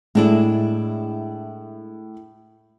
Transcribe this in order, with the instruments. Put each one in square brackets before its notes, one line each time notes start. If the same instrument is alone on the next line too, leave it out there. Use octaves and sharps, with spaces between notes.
[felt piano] A2 [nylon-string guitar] G#3 D4 E4